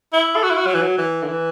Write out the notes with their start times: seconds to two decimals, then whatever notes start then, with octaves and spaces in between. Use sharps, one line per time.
0.13 E4
0.36 A4
0.43 F#4
0.50 E4
0.57 F#4
0.67 F#3
0.74 E3
0.82 F#3
0.98 E3
1.23 D3
1.28 E3